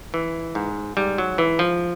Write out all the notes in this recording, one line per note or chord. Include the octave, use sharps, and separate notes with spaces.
E3
G#2
G#2 G3
F#3
E3
F3